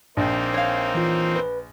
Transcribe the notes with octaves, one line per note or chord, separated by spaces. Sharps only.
A#1 A#3 C4 D#4
C#5 F5
E3 F4
B4